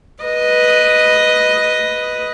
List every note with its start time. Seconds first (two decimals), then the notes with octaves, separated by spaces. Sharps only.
0.24 B4 D#5